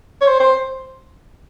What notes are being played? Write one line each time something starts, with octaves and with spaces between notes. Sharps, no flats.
C#5
C5
C5